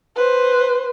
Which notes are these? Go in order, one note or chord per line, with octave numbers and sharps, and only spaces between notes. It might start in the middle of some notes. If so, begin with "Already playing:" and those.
B4 C5